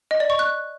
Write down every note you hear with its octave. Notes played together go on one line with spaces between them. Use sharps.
D#5
D5
C#6
F#6